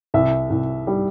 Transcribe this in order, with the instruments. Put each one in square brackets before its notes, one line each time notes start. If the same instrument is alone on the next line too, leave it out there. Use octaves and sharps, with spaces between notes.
[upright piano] C2 E5
C2
G3